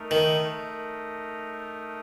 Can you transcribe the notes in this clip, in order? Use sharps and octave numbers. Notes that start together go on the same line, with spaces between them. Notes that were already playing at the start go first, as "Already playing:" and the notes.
Already playing: A3 D#4 A#4
D#3